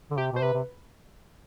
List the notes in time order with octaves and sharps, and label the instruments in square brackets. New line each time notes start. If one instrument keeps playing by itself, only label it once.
[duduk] D3
[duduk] C3 [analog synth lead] G4
[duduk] B2 [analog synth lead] C5
[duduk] C3 [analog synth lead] B4
[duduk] C3